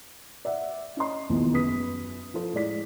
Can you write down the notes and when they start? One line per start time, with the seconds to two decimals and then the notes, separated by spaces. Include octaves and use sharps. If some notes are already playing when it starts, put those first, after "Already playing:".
0.45 D5 E5 F#5
0.97 C#4 D#5 C6
1.29 E1 A#1 D#2 B2 E3
1.53 F#2 B4 D#6 B6
2.34 F3 A4 C5
2.53 A2 G#3 D5 B6